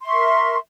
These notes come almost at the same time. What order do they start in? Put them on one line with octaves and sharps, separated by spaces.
C6 E5 C#6 A#4